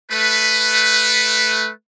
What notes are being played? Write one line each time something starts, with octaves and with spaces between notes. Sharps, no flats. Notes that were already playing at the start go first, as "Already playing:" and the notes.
A3 B4